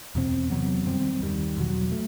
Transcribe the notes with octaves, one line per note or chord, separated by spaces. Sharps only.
E2 B2 A3 C4
E2 C3 F#3 B3
F#2 D#3 G3 C4
D#2 D#3 G3
E2 B2 F#3
A3